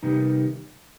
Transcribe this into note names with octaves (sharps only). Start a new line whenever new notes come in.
C3 D#3 G3 B3 D#4